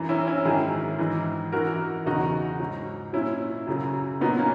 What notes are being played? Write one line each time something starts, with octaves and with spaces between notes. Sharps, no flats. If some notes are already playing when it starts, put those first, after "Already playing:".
Already playing: F#2 E3
C#4 E4
C#4 E4
G#2 D#3 F#3 E4 G#4
G#2 E3
F#2 E3 F#4 A#4
E2 C#3 E3 D#4 F#4
G#2 F#3
A#2 F#3 C#4 E4
F#2 C#3 F#3
A#2 F#3 B3 D#4
A#3 C#4